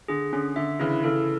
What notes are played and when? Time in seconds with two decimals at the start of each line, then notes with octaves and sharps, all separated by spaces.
0.08 D3 G#4
0.33 D3 C#4
0.56 D3 E5
0.80 C#3 E3 E4
1.04 C#3 E3 A4